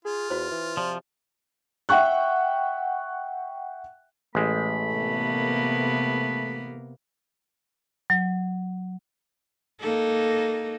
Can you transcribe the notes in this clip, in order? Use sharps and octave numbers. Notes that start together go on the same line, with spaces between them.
F4 G#4
E2 F#4 C5
E3
C3 F3 D5
E5 F#5 G5 C#6 F#6
A1 G#3 A3 B5
C3 A#3 B3
F#3
A#3 D#4 A4